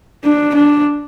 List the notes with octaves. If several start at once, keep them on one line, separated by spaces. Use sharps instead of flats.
D4
D4